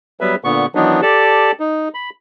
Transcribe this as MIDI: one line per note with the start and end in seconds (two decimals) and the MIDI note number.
0.21 0.35 54
0.21 0.35 55
0.21 0.35 59
0.21 0.35 71
0.21 0.35 76
0.44 0.66 46
0.44 0.66 50
0.44 0.66 59
0.44 0.66 85
0.75 1.01 51
0.75 1.01 52
0.75 1.01 54
0.75 1.01 59
0.75 1.01 62
0.75 1.01 63
1.02 1.52 67
1.02 1.52 69
1.02 1.52 74
1.02 1.52 81
1.60 1.88 63
1.94 2.10 83